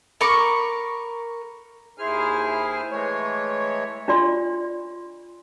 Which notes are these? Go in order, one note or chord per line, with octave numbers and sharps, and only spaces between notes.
A#4 B5 C#6 D6
D#2 E4 G#4 C5 G#5 F6
E3 G#3 A3 C#5
D4 F4 D5 C6